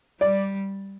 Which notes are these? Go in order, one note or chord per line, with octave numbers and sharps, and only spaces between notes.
G3 D5